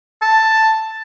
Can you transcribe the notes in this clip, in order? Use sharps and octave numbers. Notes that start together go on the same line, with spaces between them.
A5